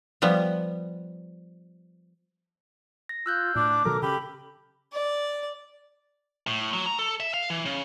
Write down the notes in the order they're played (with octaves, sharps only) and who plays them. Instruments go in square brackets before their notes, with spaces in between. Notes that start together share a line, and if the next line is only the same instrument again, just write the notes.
[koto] F3 G3 B3
[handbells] A#6
[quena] F4 [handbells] E6 F#6 G6
[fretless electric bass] A2 [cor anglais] D4 [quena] D6
[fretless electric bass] B2 D#3 F#3 [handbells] A4 [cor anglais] A#4
[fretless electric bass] C#3 [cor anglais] G4 [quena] B5
[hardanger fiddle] D5
[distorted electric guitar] A2
F#3
A#5
A4
E5
F5
E3
C#3